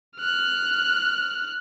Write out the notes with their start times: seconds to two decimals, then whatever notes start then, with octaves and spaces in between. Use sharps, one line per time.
0.18 F6 F#6